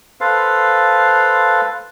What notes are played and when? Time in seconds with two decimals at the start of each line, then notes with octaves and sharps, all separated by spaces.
0.21 A4 B4 C5 F5